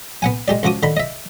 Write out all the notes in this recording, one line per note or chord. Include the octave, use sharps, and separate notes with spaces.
B3 F#5 G#5
G#3 G4 D5
C#2 F3 F#4 D6 D#6
D3 D#3 B5
D#5 E5